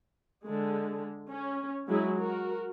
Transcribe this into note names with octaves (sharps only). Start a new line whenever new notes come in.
D3 G#3
C#4
F#3 G#3 E4 G#4
F#4 A#4